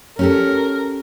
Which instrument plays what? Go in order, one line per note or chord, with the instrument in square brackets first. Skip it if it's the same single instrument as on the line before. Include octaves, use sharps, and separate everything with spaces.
[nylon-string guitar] C#4 G4 A4 [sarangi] A#4